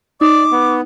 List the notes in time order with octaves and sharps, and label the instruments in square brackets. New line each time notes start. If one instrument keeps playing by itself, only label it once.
[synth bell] D#4 [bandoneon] D5 [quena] D6
[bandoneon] B3